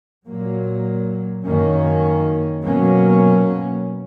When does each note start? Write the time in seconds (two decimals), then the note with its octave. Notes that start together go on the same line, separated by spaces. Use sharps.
0.27 A#2 F#3 A#3
1.45 F#2 D#3 A#3 C#4
2.63 B2 F#3 A#3 C#4